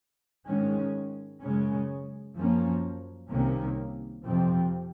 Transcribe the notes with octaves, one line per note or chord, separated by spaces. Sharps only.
G#2 D#3 G#3 C#4
F#2 C#3 G#3 C#4
F#2 F3 A#3 C#4
C2 C3 D#3 A#3 C#4
F2 C3 F3 C4